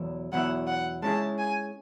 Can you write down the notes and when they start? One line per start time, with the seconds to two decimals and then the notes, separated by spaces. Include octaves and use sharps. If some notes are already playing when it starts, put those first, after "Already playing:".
Already playing: E2 B2 F#3 B3 E4
0.32 E2 B2 F#3 B3 E4 F#5
0.67 F#5
1.02 G#3 C#4 E4 G#4 A5
1.39 G#5